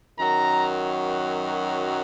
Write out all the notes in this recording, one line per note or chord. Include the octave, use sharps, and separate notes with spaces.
F#2 D#3 F#3 A#5